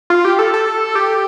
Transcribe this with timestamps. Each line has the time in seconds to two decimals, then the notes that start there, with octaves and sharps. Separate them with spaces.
0.10 F4
0.25 G4
0.39 A4
0.54 A4
0.95 G4